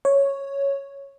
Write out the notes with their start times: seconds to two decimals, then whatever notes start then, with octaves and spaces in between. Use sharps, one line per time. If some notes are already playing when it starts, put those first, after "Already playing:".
0.05 C#5